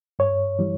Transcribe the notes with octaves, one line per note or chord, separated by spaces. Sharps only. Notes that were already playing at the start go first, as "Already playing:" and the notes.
G2 C#5
E3 G3